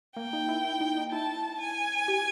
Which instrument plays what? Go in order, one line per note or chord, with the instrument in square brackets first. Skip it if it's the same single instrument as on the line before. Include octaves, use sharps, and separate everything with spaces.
[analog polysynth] A#3 [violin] G5
[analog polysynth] D#4
E4
E4
D#4
D#4
[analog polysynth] E4 [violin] A5
[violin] G#5
[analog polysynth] G4